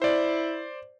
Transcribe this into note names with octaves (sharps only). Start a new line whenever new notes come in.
E4 C5 D5